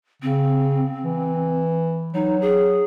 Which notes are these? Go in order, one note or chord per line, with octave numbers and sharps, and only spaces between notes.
C#3 C4
E3
F#3 D#4
G#4